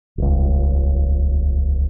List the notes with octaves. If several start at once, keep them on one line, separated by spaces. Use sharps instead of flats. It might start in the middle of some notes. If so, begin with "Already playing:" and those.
D#1 C#2